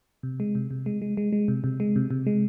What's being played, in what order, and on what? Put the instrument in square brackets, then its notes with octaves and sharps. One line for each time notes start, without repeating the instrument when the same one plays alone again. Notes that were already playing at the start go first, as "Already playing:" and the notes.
[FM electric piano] C3
G#3
C3
C3
G#3
G#3
G#3
G#3
C3
C3
G#3
C3
C3
G#3